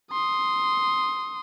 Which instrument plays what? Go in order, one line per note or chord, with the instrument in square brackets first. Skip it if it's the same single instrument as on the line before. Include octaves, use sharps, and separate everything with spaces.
[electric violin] C6 D#6